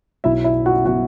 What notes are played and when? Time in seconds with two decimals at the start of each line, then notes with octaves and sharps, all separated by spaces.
0.24 B1 B2 F#3 E4 E5
0.44 E4 E5
0.66 F#4 F#5
0.85 B2 F#3 F#4 F#5